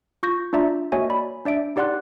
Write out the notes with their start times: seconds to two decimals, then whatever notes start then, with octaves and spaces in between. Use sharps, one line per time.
0.23 F4 C#6 G6 A#6
0.53 D4 F4 D5 E5 A#5
0.92 A#3 F#4 C#5 D#5 E5 G#5
1.10 D5 B5
1.45 D4 D5 E5 D7
1.76 D#4 G4 D5 F#5 C6 F#6